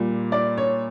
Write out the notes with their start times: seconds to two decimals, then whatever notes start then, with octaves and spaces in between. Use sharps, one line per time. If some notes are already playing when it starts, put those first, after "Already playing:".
Already playing: A#2 G3
0.32 D5
0.58 C#5